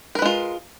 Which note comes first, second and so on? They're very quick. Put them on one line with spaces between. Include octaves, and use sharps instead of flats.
A#4 B4 G#3 F4